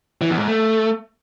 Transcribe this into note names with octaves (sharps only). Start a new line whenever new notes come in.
E3
E2
G#2
A3